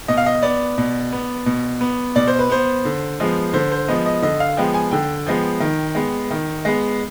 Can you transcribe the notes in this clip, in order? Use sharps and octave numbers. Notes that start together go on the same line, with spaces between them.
B2 D#5
F5
D#5
B3 D5
B2
B3
B2
B3
B2 D5
C5
B4
B3 C5
D3
F3 G#3 B3
D3 C5
C5
F3 G#3 B3 D#5
D#5
D3 D#5
F5
F3 G#3 B3 G5
G#5
D3 G5
F3 G#3 B3
D#3
G#3 B3
D#3
G#3 B3